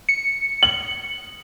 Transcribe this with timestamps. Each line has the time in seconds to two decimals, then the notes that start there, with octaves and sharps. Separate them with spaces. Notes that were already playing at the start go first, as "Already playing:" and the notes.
0.09 C#7
0.63 F#7